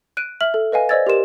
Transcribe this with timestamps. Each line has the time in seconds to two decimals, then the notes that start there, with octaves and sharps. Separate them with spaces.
0.17 F#6 D7 D#7
0.41 E5 F6 F#7
0.54 A4
0.72 B4 D#5 F5 G#5
0.89 C5 D5 D#5 E6 G#6 A6
1.07 G4 A#4 C6 E7